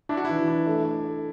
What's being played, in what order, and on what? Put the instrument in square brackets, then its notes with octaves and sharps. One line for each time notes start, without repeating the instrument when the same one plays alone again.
[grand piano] D4 [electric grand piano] E4
[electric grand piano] F#4
[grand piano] E3 [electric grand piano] E4
[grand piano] D4
A3
A3
A3